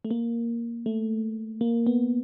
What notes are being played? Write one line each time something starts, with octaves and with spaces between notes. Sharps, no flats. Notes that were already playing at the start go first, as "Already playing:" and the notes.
A3
A#3
A3
A#3
B3